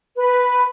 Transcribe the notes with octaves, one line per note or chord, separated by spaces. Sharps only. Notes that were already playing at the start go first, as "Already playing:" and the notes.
B4